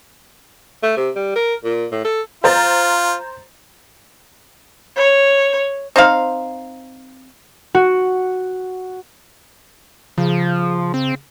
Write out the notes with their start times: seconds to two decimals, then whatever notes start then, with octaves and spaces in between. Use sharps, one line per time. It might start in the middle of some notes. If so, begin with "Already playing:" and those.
0.83 A3
0.97 C3
1.16 G3
1.36 A#4
1.64 A#2
1.92 A2
2.05 A4
2.44 F4 C5 A#5 A6
4.97 C#5
5.96 C4 D#4 C5 F5
7.75 F#4
10.18 C#3 F3
10.94 C4